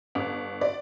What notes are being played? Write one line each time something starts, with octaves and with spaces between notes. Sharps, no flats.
G1
D5